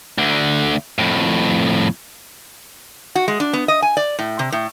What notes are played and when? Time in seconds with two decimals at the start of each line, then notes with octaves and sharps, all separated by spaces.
0.18 D2 D3
0.99 F2 A2
3.15 F#4
3.28 G#3
3.40 D4
3.53 B3
3.68 D#5
3.82 G#5
3.97 D5
4.19 A2
4.39 C3
4.52 A2